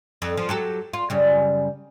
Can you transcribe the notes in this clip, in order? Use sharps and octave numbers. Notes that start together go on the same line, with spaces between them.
F2
F3
F#3 G4 A4
F4
F#2 C#3 G3